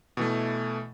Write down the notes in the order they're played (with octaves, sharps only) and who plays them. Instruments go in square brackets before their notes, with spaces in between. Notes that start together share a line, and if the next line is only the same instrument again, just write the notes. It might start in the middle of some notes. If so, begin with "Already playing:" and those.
[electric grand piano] B2 E3 A3